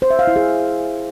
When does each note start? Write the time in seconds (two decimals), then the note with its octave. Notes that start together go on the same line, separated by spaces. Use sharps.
0.02 C5
0.11 E5
0.19 F5
0.27 E4
0.36 G#4